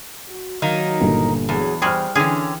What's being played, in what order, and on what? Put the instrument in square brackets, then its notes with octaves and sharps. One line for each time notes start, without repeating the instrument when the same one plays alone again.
[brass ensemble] F#4
[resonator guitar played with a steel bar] D#3 A#3 D#4 [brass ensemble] F#3
[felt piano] G1 A#2
[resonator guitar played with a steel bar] E2 [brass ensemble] F#3 G#4
[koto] G3 F#4 G#4 [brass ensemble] C5 G5 [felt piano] C6 F6
[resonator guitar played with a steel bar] D3 C#4 [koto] E3 G#4 [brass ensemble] G5